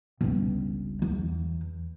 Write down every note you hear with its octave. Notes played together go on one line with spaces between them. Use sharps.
G1 C#2
E2